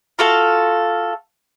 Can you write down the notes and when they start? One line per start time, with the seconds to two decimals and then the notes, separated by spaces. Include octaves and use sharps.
0.19 F4 F#4 A4 F5